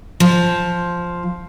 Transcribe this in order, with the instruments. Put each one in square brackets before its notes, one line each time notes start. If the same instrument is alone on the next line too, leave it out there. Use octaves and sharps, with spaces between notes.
[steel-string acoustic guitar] F3